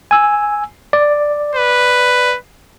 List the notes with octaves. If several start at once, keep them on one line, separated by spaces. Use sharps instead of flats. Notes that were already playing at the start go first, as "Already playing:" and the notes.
G#5 E6
D5
B4